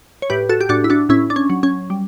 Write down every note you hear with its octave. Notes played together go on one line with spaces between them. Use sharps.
C#5
A2 G4 B4
F#4 A4
G4
A2 D4 F#4
E4
D4 F#4
A2 C#4 E4
D4
C#4
F#3
C#4
G3